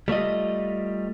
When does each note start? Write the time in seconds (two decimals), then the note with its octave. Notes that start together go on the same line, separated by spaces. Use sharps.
0.08 G3 A3 F4 D#5